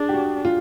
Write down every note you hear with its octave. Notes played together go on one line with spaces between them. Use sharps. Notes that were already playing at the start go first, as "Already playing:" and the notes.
Already playing: D4 G#4
G4
F#4
F4